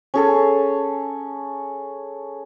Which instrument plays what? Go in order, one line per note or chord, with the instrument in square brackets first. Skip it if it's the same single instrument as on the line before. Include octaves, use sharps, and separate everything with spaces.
[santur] C#4 G#4 A4